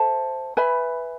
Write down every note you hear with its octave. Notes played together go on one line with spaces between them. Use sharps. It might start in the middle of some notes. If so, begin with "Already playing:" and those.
Already playing: A4 C5 E5 A5
B4 E5 G#5 B5